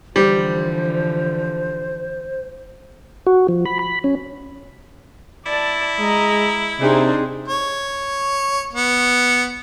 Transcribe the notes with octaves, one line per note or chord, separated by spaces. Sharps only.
D3 E3 F3 G3 C5
F#4
F3
B5
B5
C#4
E4 D5 A5
G#3 D#5 A#5
C3 C4 D4 D#4 G#4
C#5
B3